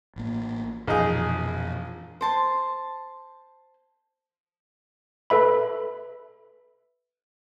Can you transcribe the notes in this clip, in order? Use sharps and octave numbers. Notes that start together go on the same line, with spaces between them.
A1 A#3
A#1 F2 B2 E3 D#4 G#4
C5 A5 C6
A4 B4 E5 B5